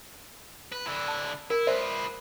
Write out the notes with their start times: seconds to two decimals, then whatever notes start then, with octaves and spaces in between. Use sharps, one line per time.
0.72 B4
0.87 D3 E4
1.08 A5 E6
1.50 E4 A#4
1.67 F4 B4 C5 D5 E5